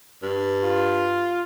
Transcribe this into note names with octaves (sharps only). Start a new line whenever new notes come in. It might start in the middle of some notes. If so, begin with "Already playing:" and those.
G2
F4